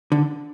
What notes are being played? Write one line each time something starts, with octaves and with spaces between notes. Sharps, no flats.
D3